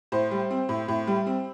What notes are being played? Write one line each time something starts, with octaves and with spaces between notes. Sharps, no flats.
A2 C5
G3
C4
A2
A2
G3
C4